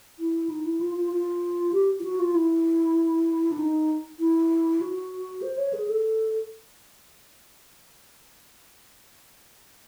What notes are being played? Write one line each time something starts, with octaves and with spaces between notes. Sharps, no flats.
E4
D#4
E4
F4
F4
F4
G4
F4
F#4
F4
E4
D4
D#4
E4
F#4
C5
C#5
G#4
A4